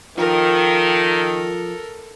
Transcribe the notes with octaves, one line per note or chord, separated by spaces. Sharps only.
D#3 F3 A4 A#4